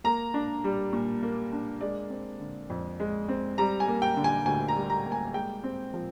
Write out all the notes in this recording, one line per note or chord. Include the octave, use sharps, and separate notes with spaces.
A#3 A#5
D4
G3
A#2
A#3
D4
G#3 D5
C4
D3
F2
G#3
C4
G3 A#5
G#5
A#3
G5
D3
G#5
D2 G#5
A#5
G3
A#5
A#3
G#5
G#3 G5
C4
F3